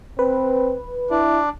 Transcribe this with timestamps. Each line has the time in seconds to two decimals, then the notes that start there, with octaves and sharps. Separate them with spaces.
0.19 C4 B4
1.11 D4 E4